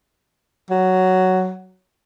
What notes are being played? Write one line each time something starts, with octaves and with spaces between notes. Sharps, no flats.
F#3